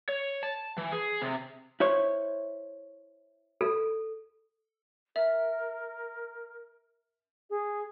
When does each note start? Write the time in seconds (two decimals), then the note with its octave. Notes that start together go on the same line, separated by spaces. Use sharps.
0.09 C#5
0.43 A5
0.78 E3
0.92 G#4
1.22 C3
1.80 E4 C5 C#5
3.61 A4
5.16 A#4 E5
7.50 G#4